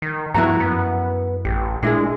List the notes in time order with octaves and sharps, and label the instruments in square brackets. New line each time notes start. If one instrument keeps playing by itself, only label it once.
[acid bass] D#3
[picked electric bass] G2 F3 B3 [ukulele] E4 B4 A#5 [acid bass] F#4
[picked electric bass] F#2 [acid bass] B3
[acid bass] A1 [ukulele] G4
[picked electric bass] A#2 [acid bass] G#3 [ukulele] D4 E4 G#4